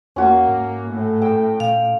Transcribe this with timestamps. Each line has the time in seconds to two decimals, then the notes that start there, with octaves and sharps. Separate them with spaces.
0.16 E2 A#3 C#4 F#4
0.49 G#2
0.87 A2
1.22 G5 E6
1.60 A#2 F5